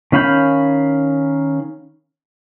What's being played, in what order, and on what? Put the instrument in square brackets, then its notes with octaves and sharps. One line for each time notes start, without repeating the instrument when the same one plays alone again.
[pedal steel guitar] D#3 C#4 F5 B5 G6